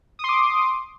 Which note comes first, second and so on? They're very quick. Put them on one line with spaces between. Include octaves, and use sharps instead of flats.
D#6 C6 D6